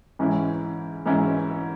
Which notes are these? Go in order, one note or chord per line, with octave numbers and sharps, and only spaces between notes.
G#2 E3 C#4 E4
G#2 E3 C#4 E4